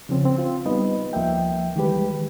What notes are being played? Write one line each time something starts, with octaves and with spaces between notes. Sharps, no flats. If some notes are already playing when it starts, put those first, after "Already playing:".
C#3 F3 C4 C#4
C4
F4
G3 B3 D#4 B4 D#5
D2 F3 A#3 E5 G5
D#3 E3 G3 G#3 G4 B4